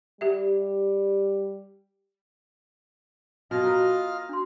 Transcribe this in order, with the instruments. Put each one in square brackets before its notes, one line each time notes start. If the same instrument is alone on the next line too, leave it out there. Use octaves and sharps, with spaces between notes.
[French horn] G3 [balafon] G4 E5
[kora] B2 [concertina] F4 D#5 F6
[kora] A#4 B4
[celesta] D4 F#4 C6